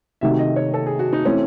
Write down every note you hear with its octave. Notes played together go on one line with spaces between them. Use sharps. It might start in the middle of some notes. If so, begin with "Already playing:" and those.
C3 D#3 A3 D#4 F#4 E5
D#5
C#5
A4
G#4
F#4
D#4
E3 A3 C4 C#4